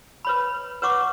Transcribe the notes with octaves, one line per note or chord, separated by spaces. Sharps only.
B4 C#5 B5
B4 C#5 F#5 C#6 D6